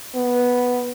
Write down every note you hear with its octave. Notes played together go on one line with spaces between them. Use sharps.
B3